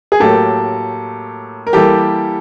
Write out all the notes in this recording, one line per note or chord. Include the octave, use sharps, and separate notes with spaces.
G#4
A2 F#3 A#3 G4 A4
A#4
E3 G3 A#3 G4 A4